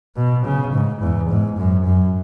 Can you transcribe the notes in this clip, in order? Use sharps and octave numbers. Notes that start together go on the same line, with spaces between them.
B2
C#3
G#2
E2
G#2
F#2
F#2